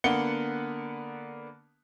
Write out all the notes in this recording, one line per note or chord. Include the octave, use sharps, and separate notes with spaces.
D3 A#3 B3 F#5 C#7 G7